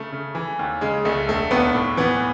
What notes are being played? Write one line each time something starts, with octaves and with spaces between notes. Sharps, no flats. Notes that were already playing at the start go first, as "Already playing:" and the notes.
Already playing: C#3 A3
C#3
E3
D#2
C#3 G#3
C#2 A3
E1 A3
D#2 B3
A2
E3 B3